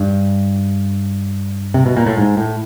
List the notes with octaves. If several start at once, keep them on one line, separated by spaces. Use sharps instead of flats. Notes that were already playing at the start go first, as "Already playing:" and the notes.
Already playing: G2
C3
B2
A#2
A2
G#2
A2